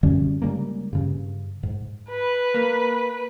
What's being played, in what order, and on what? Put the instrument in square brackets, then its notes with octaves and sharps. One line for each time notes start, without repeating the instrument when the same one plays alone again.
[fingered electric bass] F#2 D3 G3 C#4
C#3 G3 G#3 A#3
G2 C#3
G#2
[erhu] B4
[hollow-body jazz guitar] A#3